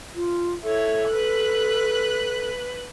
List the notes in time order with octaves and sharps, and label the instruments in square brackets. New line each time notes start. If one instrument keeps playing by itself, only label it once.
[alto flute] F4
[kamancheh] E4 C#5 [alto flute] A4
[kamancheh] B4 F#6